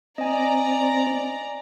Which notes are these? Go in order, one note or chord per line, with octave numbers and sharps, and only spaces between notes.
C4 D5 D#5 G#5 A#5